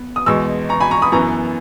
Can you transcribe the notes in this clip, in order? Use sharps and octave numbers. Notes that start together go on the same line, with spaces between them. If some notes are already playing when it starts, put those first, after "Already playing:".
Already playing: B3
D#6
E2 B2 G#3 C#6 E6
A#5 C#6
G#5 B5
A#5 C#6
B5 D#6
F#2 E3 B3 A#5 C#6